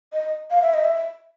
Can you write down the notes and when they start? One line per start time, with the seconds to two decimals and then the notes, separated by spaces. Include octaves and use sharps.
0.13 D#5
0.51 F5
0.62 E5
0.74 D#5
0.84 E5